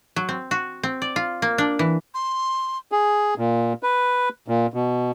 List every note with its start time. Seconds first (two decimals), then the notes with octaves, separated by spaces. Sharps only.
0.16 F#3
0.29 C4
0.51 F#4
0.83 C4
1.02 D5
1.16 F4
1.42 A#3
1.58 D4
1.79 E3
2.14 C6
2.92 G#4
3.38 A#2
3.83 B4
4.48 A#2
4.74 B2